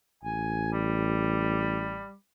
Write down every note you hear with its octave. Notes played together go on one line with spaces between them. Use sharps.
A1 G#5
G3